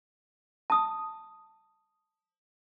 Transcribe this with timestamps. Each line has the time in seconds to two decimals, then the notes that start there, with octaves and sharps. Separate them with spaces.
0.70 A5 D#6